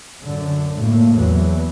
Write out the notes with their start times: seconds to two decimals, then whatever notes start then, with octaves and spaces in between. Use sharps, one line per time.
0.22 F#2 D3
0.78 A2 A#3
1.15 E2 E3 F#3